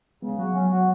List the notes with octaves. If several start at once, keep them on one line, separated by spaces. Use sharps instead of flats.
C#3 G#3 B3
F#3 F#4
F#3 C#4
F#4